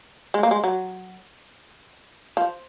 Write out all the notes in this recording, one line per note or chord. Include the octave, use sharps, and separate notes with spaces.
G#3
A#3
G#3
F#3
F3